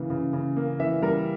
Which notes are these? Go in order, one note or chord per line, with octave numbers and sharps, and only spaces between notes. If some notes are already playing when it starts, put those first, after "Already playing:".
Already playing: C#3 E3 A#3
C#3
C#3
A#3
E3 E5
G3 A#4